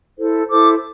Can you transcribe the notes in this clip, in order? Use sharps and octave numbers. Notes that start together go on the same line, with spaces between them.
E4 A4 C5
E4 A4 C5 D6